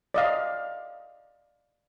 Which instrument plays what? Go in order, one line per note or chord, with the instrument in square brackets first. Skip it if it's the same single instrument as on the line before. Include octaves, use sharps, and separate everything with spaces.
[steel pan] D5 D#5 F5